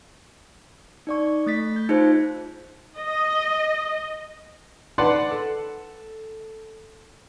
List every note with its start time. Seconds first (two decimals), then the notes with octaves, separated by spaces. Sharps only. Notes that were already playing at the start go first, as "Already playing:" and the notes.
1.07 D#4 D5 C#6
1.46 A3 A6 B6
1.76 G6
1.89 D#4 F4 G#4 C5
2.98 D#5
4.98 B4 D5 F#5 A5 C6
5.31 A4